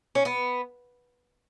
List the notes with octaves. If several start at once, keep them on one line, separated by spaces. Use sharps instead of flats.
C#4
B3